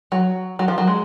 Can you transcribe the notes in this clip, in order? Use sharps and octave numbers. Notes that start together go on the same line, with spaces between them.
F#3
F#3
F3
F#3
G#3